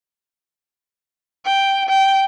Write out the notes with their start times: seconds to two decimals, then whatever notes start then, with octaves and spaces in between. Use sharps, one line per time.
1.45 G5
1.89 G5